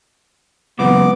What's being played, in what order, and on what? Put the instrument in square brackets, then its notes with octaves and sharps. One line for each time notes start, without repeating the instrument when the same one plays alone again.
[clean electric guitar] C#2 F#2 A#2 [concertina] B3 D6